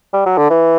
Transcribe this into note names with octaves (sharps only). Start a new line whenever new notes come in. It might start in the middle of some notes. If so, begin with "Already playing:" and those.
G3
F#3
D3
E3